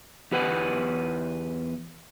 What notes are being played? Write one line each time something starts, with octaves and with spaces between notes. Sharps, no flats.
E2 G4 B4 F#5